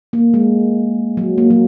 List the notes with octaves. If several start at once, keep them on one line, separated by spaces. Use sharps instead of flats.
A#3
G#3
F#3
A#3
F#3